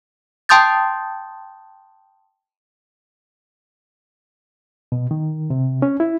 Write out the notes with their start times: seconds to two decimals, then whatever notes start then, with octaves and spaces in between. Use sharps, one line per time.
0.49 G5 A5 C6 D#6 G6 A6
4.92 B2
5.11 D#3
5.50 C3
5.82 C#4
6.00 E4